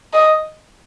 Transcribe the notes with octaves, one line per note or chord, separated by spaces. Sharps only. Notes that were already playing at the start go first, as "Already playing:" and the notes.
D#5